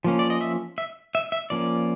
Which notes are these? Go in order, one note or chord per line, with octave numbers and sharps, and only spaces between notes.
F3 A#3 C#4
D5
D#5
E5
E5
E5
E5
F3 A#3 C#4 D5